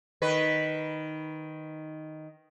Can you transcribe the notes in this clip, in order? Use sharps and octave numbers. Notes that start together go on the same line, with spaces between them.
D#3 B4